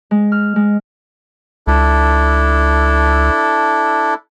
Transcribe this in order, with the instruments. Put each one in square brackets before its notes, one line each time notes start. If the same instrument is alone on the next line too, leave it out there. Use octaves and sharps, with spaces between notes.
[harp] G#3
F6
G#3
[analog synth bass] C#2 [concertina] D4 E4 A4